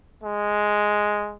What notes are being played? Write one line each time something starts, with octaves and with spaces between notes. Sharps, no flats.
G#3